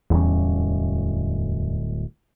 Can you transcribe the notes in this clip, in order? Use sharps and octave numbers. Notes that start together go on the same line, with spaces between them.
D1 E2 G3 C#4